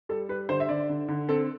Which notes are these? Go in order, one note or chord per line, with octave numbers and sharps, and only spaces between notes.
G3 A4
G3 B4
D3 C5
E5
D3 D5
D3
D3
C4 A4